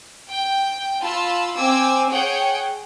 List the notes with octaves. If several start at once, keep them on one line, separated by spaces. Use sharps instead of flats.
G5
F4 A5 B5 E6
C4 G#5 D6 E6
G#4 C#5 F#5 G5